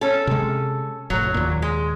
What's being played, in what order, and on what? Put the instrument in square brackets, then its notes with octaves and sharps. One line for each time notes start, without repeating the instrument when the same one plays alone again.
[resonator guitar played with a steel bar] C#4 A4
[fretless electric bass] C3 G#3
[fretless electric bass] F1 A2 [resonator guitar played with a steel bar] F#3
[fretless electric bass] D#2 A#2
[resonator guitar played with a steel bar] G#3